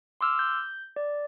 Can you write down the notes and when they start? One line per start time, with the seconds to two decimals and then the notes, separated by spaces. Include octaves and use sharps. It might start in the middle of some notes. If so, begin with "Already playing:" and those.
0.21 C6 D6 E6 F6
0.39 G6
0.96 D5